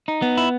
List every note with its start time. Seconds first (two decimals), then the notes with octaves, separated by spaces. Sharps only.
0.08 D#4
0.22 B3
0.37 E4